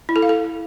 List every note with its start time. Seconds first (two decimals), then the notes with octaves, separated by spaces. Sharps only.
0.09 E4
0.16 A4
0.22 F5
0.29 A4